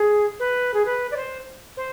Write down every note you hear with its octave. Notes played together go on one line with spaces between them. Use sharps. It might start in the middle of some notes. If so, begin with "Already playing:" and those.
Already playing: G#4
B4
G#4
B4
D5
C5
C5